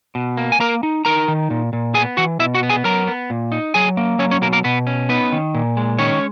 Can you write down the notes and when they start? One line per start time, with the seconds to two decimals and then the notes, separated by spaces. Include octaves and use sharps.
0.15 B2
0.37 A#3
0.52 G#5
0.60 A#3 A#4 A#5
0.83 D#4
1.05 D#4 A#4 A#5
1.28 D#3
1.50 A#2
1.73 A#2
1.94 B3 G#4 G#5
2.17 E3 F#4 F#5
2.39 B2 E4 E5
2.54 F#4 F#5
2.63 B3
2.69 G#4 G#5
2.84 F#3 A#4 A#5
3.07 B3
3.30 A#2
3.52 D#4
3.74 F#3 G#4 G#5
3.97 A#3
4.19 F#3 C#4 C#5
4.31 C#4 C#5
4.41 B2 A#3 A#4
4.53 A#3 A#4
4.64 B2 B3 B4
4.87 C#4
5.09 B3 D#4 B4
5.32 D#3
5.55 A#2
5.77 G#3
5.98 D#3 C#4 C#5